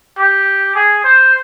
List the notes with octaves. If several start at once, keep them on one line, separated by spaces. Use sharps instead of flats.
G4
G#4
C5